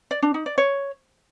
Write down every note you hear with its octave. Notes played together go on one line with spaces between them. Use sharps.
D5
D4
D#4
D5
C#5